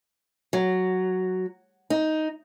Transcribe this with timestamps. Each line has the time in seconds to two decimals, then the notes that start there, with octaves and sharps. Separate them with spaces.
0.53 F#3
1.90 D#4